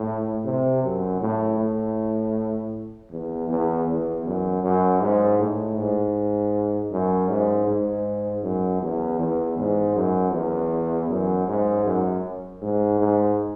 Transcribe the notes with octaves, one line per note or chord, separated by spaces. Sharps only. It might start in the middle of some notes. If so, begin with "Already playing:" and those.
Already playing: A2
C3
F#2
A2
A2
E2
E2
E2
F#2
F#2
G#2
A2
G#2
F#2
G#2
G#2
F#2
E2
E2
G#2
F#2
E2
F#2
G#2
F#2
G#2
G#2